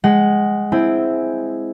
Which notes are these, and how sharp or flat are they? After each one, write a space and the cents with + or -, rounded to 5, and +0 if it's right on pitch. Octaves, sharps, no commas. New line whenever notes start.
G#3 -5 F#5 +20
C4 +0 E4 +0 G#5 +0